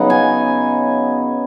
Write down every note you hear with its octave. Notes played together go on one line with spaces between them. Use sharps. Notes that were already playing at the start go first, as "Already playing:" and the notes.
Already playing: C#3 F#3 B3 D#4 F#5
G#5